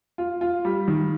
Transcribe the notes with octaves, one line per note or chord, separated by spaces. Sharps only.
F4
F4
G3
D#3